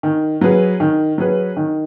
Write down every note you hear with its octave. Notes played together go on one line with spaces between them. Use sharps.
D#3
F#3 C#4 G#4 B4
D#3
F#3 C#4 G#4 B4
D#3